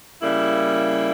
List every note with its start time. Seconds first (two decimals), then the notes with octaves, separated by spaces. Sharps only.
0.22 C#3 G3 A#3 E4